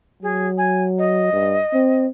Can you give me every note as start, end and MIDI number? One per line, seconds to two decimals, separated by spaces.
0.23 1.30 54
0.23 0.47 68
0.58 0.83 80
0.98 2.05 75
1.33 1.59 43
1.73 2.07 60